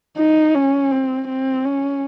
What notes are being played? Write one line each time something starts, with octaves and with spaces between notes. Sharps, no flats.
D#4
C#4
C4
C4
C#4